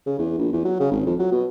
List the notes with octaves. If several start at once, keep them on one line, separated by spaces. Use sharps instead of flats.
C#3
E2
A#1
E2
F#3
C#3
G#1
F2
F#3
B2